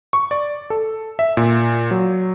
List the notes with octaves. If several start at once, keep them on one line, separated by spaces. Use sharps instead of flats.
C#6
D5
A4
E5
A#2
F#3